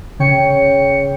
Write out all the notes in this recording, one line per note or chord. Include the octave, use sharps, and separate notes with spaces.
C#3 C#5 G5 C#7